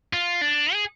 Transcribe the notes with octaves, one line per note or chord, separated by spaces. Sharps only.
F4
D4
G#4